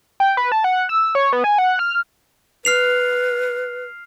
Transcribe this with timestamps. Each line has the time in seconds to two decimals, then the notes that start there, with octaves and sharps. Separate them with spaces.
0.20 G5
0.37 B4
0.52 A5
0.64 F#5
0.89 E6
1.15 C#5
1.33 B3
1.44 G#5
1.58 F#5
1.79 F6
2.65 B4 F6 C7 F7